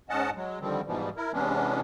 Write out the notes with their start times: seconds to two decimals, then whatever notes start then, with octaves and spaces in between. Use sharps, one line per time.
0.09 G#2 C#4 D#5 F#5 A5
0.35 F#3 G#3
0.61 D3 D#3 F3 G3 C4
0.87 G#2 B2 E3 F3 G3
1.17 E4 A#4
1.33 C3 E3 G#3 B3 C#4 D4